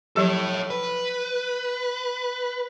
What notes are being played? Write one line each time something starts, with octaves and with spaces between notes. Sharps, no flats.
F3 F#3 G4 A4 C#5
B4